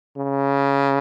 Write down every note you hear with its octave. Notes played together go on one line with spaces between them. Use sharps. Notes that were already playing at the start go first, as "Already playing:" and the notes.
C#3